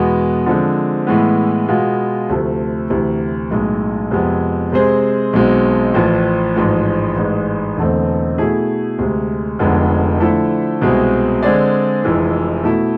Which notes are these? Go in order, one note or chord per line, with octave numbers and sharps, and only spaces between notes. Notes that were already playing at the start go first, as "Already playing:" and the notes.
Already playing: E2 B2 G#3 B3
D3 F3 G#3 C4
A2 E3 G#3 B3
B2 G#3 B3 F4
D2 C3 F3 A3
D2 C3 E3
B1 A2 G#3
F2 C3 G#3 B3
C3 G#3 C4 G#4 C5
B1 B2 G#3 C4
A1 A2 F3
A1 G#2 F3 G#3
A1 G#2 G#3
E1 E2 D3 A3 C4
B2 A3 E4 G#4
D2 C3 G#3
F1 F2 D3 G#3 B3
D3 F3 A3 E4 A4
C2 B2 G#3 C4 G#4
D3 G#3 C4 G#4 D5
F1 F2 E3 G#3
B2 A3 E4